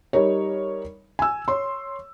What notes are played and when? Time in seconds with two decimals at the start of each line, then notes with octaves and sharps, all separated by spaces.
0.13 G3 D#4 A#4 C#5
1.19 G#5 E6
1.48 C#5 C6